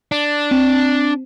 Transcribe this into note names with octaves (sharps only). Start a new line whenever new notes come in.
D4
C4